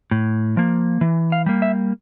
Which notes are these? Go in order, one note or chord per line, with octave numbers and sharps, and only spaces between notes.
A2
F3 A#3
E3
F5
G3 A#3
E5